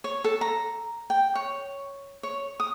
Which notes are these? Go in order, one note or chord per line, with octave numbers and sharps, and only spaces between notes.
C#5
A4
A#5
G5
C#5
C#5
D#6